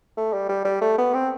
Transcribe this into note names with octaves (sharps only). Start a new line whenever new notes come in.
A3
G3
G3
G3
A3
B3
C4